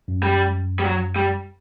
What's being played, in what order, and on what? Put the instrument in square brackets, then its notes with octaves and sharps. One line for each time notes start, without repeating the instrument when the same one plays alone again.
[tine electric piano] F#2
[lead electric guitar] G3
G3
F#3
G3